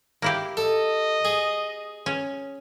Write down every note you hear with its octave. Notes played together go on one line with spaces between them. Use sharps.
A#3 E4 G4
A4 D#5
G#4
C#4